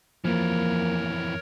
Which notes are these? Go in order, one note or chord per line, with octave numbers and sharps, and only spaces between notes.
F2 E3 F3 A#3 A#4 C#5